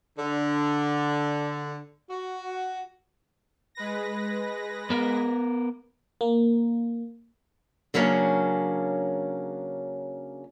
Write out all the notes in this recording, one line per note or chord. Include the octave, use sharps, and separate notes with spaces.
D3
F#4
G#3 B4 A#6
B3 A#4
A#3
C#3 F#3 A#3 C#4 D4